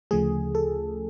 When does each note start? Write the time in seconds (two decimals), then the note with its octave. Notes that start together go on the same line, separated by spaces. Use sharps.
0.11 D2 C#3 F3 A3 G#4
0.55 A4